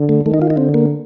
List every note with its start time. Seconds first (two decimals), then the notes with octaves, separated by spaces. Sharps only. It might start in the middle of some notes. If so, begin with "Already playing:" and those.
Already playing: D3
0.09 A3
0.25 D#3 A3
0.34 D#4
0.42 F4
0.50 D#4
0.57 D3 C4
0.74 A#3